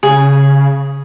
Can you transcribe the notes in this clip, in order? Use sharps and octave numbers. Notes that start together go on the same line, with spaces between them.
C#3 G#4